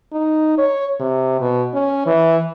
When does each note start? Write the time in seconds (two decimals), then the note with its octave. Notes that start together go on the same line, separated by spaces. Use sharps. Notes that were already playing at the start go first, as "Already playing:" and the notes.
0.13 D#4
0.58 C#5
1.00 C3
1.41 B2
1.74 C#4
2.06 E3